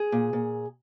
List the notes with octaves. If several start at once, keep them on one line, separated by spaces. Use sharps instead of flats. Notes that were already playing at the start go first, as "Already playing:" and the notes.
Already playing: G#4
A#2
A#2